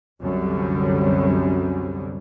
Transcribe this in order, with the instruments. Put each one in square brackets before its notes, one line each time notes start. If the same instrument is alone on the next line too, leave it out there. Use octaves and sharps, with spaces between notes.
[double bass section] C2 F#2 D3 G3